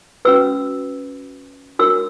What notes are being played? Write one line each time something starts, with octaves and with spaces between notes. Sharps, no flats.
C#4 F#4 B4 E6
D4 F#4 A#4 C#5 E6